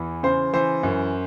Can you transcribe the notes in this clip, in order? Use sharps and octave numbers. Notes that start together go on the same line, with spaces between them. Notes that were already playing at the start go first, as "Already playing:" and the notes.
Already playing: E2 E3
C#3 C5
E3 C5
F#2